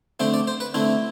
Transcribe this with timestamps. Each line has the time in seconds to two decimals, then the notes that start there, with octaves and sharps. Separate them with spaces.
0.20 D3 A3 C4 C5
0.34 D5
0.47 C5
0.60 B4
0.74 D3 A3 C4 E4